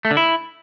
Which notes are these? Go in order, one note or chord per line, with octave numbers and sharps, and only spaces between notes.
A3
D3
E4